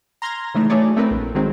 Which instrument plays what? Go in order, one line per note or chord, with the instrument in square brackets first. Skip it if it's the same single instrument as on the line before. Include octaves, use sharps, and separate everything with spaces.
[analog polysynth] A#5 C6 F6 G#6 A#6
C#3 E3 G#3 A3 D#4
F#3 A3 G#4 C#5 D5
A3 C4 E4 A#4 B4
A#1
D#3 F#3 G#3 C4 D#4